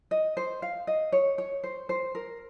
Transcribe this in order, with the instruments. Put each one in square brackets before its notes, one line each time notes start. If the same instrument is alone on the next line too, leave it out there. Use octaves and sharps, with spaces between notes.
[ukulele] D#5
C5
F5
D#5
C#5
C#5
C5
C5
A#4